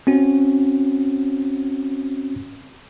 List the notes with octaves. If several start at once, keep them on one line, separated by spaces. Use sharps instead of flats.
C4 C#4 F#4